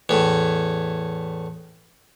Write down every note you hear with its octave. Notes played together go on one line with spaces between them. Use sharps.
E2 A2